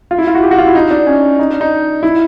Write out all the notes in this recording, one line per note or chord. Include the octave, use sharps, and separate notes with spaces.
F4
E4
F4
F#4
G4
F#4
F4
E4
D#4
D4
C#4
D#4
D4
D#4
E4